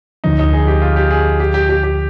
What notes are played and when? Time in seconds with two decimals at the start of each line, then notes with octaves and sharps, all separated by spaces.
0.24 D2 D3 F3 D#4
0.39 D#4
0.53 G#4
0.67 G4
0.81 F4
0.96 G4
1.11 G#4
1.40 G4
1.54 G4
1.69 G4
1.83 G4